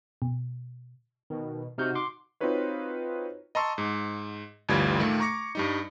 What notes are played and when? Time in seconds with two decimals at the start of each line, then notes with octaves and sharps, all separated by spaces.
0.22 B2
1.30 B2 D#3
1.78 C3 D#4 F#4 F6 G6
1.95 C6 D6
2.40 C4 D#4 F4 F#4 B4 C#5
3.55 D#5 A5 A#5 C6 C#6 E6
3.78 G#2
4.69 G1 D2 E3 G3 F4 G#6
4.99 A#2 D#3 A3 A#3
5.20 A#5 C#6 D6 A#6 C#7
5.55 G2 G3 D#4